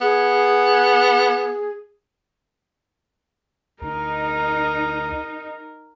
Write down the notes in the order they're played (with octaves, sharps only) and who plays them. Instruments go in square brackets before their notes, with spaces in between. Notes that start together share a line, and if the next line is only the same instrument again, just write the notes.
[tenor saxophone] B3 [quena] G#4
[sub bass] D2 [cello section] D#4 [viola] A#4